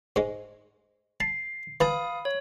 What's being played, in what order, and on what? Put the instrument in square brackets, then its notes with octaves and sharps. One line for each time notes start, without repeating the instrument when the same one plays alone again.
[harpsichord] G#2 G#3
[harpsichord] A5 [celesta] C7
[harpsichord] E3 A5 [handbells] F5 D#6 [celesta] B5
[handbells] C#5